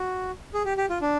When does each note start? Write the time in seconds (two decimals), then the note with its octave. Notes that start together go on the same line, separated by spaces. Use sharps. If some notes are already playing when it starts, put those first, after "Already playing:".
Already playing: F#4
0.54 G#4
0.65 G4
0.77 G4
0.90 F4
1.02 D4